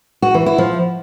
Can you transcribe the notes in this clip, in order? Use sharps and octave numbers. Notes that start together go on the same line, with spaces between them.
F#4
E3
E4
F3